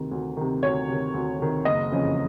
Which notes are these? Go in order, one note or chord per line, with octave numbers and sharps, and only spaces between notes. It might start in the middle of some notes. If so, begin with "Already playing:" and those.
Already playing: D2 C3 D#3
D2
C3 D#3
D2 C#5
C3 D#3
D2
C3 D#3
F#1 D#5
F2 C#3 E3